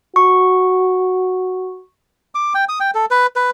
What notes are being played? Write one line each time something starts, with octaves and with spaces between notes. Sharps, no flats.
F#4 C#6
D6
G5
D#6
G5
A4
B4
B4